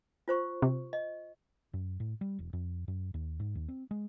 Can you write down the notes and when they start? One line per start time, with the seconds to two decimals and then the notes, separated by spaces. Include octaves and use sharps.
0.28 F4 C5 C#6
0.62 C3
0.93 D#5
1.73 F#2
2.00 A2
2.21 G3
2.39 E1
2.53 F2
2.88 F#2
3.14 D#2
3.40 G#2
3.55 D#2
3.68 C4
3.91 G#3